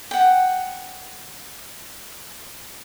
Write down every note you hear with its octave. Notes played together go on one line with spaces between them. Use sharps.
F#5 G5